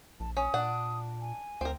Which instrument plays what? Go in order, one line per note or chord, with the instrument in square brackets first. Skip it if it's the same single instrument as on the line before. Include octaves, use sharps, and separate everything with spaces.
[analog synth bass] A#1 [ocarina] A5
[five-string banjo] C#4 [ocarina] D#6
[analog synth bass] A#2 [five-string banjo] D4 F#5
[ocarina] G#5
[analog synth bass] D2 [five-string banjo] C4 A#4